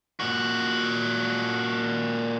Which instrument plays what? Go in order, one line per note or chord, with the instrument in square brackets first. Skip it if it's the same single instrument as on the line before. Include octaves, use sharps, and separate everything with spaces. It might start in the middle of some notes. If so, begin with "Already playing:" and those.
[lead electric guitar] A#2 F#4